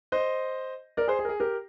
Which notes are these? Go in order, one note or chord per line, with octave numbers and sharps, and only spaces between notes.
C5 D#5
A#4 D5
G#4 C5
G#4
A#4
G#4
G4 A#4